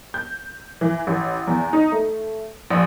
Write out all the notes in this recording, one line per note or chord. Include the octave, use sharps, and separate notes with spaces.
G6
E3
A1
E2
D#4
A3
A#1